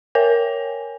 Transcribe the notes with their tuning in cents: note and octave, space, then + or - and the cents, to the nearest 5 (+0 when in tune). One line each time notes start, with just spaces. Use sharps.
A#4 +0 C#5 +0 G#5 -10